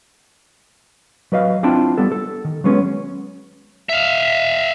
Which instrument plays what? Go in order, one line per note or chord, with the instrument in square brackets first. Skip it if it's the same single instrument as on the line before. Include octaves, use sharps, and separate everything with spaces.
[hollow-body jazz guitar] F#3 B4 D#5 F5
C4 D4 E4 F4 G5 A5
G3 B3 A4
A4
D#3
F#3 G#3 B3 C#4
[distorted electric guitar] E5 F5